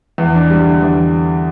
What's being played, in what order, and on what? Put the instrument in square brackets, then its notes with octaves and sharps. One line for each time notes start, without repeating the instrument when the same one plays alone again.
[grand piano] E2
D4
G3
D3
E2